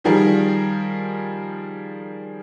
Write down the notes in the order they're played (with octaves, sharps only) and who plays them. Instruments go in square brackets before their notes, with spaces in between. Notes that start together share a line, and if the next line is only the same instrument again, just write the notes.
[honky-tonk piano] D#3 F3 G3 G#4 A#4